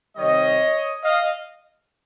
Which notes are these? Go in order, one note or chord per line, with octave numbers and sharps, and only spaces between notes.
C3 D#3 G3 C#5 D#5
D#5 F5